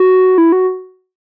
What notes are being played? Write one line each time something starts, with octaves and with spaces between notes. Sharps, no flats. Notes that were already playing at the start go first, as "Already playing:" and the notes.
Already playing: F#4
E4
F#4